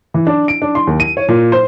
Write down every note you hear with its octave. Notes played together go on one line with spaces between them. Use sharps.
E3
D4
D7
D4
C6
D#2
D#7
C#5
A#2
C5